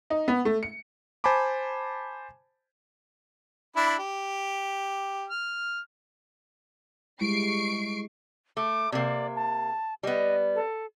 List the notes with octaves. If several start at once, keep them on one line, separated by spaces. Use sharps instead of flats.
D#4
B3
A3
C#7
C5 G#5 A5 B5 D6
D4 E4 B5
G4
F6
G3 G#3 E4 C#6 C7 D7
A3 D6
C3 A#3 D5
A5
G3 B3 D#5
A4